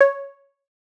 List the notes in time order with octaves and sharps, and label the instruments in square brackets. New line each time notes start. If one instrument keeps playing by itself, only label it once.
[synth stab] C#5